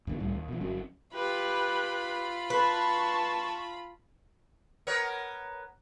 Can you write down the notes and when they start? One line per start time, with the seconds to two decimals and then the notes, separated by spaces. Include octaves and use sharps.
0.07 F2 D3 A#3
0.20 C#2 A2 G3
0.34 D#2
0.48 B2 F3
0.61 G1 F#3 C#4
1.13 F4 G4 B4 B5
2.50 B4 A5 C#6
4.87 B3 A#4 C#5